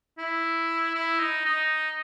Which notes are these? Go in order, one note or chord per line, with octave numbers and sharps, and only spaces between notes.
E4
E4
D#4
D#4